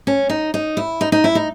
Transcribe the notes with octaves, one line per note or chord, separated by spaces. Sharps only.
C#4
D#4
D#4
E4
D#4
D#4
E4
D#4